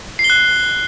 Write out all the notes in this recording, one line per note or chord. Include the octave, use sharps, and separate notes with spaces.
C7
G7
F#6